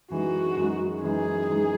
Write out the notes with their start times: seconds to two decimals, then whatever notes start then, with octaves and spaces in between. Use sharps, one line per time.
0.10 F#2 E3 G#3 D#4 F#4
0.56 F#2 E3 G#3 D#4
1.02 F#2 E3 G#3 D#4 G#4
1.49 F#2 E3 G#3 D#4